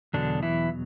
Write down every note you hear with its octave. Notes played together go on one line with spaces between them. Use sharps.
E2 B2 D3 F#3 D4
E3 E4